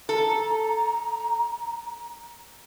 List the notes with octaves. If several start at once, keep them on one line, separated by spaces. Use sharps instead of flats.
A4 A#5